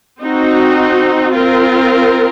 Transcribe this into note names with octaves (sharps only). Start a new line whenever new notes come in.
C4 D#4 F#4
C4 F4 A#4